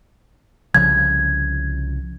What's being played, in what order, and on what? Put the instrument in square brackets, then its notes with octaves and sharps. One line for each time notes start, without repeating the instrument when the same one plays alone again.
[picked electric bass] C2 C#3 F3 [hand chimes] G#6